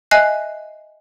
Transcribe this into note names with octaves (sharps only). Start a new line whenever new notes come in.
D#5 E5 G#5 F#6 C7